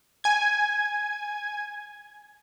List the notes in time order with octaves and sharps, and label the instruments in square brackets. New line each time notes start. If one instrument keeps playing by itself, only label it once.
[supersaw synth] G#5 G#6